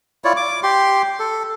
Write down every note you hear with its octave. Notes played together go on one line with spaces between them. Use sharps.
E4 F4 C#5 D5
D6
G4 C6
A4